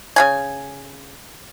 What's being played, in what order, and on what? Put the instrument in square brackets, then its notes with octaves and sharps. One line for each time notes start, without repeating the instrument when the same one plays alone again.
[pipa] C#3 D4 G#5